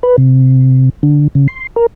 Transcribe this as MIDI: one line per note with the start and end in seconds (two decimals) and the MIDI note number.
0.03 0.16 71
0.18 0.90 48
1.03 1.28 50
1.35 1.47 49
1.48 1.67 84
1.76 1.86 70